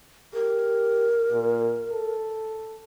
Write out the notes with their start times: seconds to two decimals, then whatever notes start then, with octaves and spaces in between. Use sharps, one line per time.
0.34 G4 A#4
1.32 A#2
1.92 A4